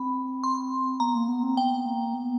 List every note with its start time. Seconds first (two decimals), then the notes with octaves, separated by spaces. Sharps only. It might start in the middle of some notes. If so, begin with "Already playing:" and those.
Already playing: C4 B5
0.44 C6
1.00 B3 A#5
1.15 A#3
1.28 B3
1.43 C4
1.57 B3 G5
1.86 A#3
2.14 B3